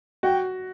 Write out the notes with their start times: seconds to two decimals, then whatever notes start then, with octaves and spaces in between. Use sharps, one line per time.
0.23 F#4 G5